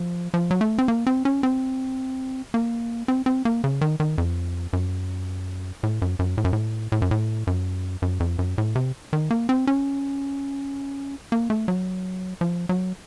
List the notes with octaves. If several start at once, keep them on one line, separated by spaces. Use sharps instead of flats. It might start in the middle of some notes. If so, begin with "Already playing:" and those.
Already playing: F3
F3
F#3
A3
C4
A#3
C4
C#4
C4
A#3
C4
C4
A#3
C#3
D#3
D#3
F2
F#2
A2
F#2
F#2
A2
F#2
A2
A2
F#2
A2
F#2
F#2
F2
F#2
A2
C3
D#3
A#3
C4
C#4
A#3
A3
F#3
F3
F#3